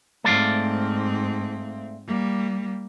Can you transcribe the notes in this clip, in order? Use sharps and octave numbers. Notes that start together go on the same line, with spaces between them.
G#2 A3 C4 D5 F5
G3 A#3